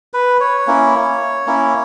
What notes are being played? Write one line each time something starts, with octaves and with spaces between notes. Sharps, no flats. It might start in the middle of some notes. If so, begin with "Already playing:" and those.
B4
C#5
A#3 C#4 E4
A#3 C#4 E4